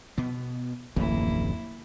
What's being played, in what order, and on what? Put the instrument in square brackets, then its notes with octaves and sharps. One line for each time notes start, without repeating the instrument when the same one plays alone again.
[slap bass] B2 B3
[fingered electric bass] D1 A1 [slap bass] F2 [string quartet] A#3 E4